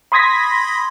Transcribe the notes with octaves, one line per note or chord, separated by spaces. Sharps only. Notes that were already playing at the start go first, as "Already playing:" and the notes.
B5 C6 D#6 G#6 A#6 B6